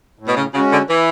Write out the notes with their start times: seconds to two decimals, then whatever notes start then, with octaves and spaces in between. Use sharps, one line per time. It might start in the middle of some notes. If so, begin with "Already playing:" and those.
0.19 A2
0.27 B2
0.37 C#3
0.54 C#3 G#3 C#4 F#4
0.72 D3
0.89 E3